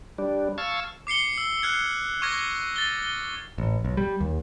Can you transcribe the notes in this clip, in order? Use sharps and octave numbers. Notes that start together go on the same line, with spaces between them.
G3 D4
F5 A5 C#6 E6 G#6
D6 C7 C#7 G7
E6
F6 F#6 G#6 C7
C#6 D6 F6 G#6 A#6
A6 G7
G7
A1
B1
G3
D#2